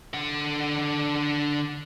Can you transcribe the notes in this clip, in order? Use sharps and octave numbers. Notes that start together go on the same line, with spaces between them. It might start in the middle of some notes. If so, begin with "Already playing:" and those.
D3 F#5